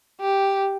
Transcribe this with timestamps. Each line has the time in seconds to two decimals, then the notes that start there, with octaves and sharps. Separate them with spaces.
0.20 G4